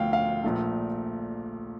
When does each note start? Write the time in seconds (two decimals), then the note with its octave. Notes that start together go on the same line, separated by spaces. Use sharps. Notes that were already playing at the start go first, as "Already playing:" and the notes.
Already playing: D2 D3 F3 A3 F5 G5
0.13 F5
0.44 A#1 A#2 A3